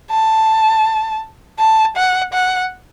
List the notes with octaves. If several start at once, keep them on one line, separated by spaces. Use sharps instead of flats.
A5
A5
F#5
F#5